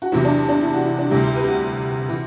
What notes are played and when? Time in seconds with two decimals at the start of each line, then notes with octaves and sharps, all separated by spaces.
0.02 F#4
0.12 E2 C3 F#3 E4
0.24 D4
0.49 D4
0.61 E4
0.74 F#4
0.85 E4
0.99 D4
1.10 D2 C3 G3 E4
1.23 G4
1.36 B4
1.42 G4
1.47 F#4
2.08 C3 E3